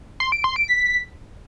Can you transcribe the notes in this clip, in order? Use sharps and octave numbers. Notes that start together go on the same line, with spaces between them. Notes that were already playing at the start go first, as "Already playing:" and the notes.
C6
D7
C6
D7
B6